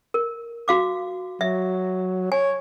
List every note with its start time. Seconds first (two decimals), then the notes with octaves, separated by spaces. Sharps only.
0.14 A#4
0.68 F#4 F5 D6
1.41 F#3 E5
2.32 C#5 G#5